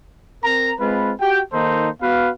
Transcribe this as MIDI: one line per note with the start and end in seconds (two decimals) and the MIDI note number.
0.44 0.72 60
0.44 0.72 70
0.44 0.72 82
0.80 1.12 56
0.80 1.12 60
0.80 1.12 65
0.80 1.12 71
1.20 1.41 66
1.20 1.41 67
1.20 1.41 79
1.53 1.89 51
1.53 1.89 58
1.53 1.89 63
1.53 1.89 69
1.53 1.89 72
2.02 2.29 59
2.02 2.29 66
2.02 2.29 71
2.02 2.29 77